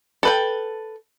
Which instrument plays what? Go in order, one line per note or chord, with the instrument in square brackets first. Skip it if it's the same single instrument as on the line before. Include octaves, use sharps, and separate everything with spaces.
[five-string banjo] A4 B4 G5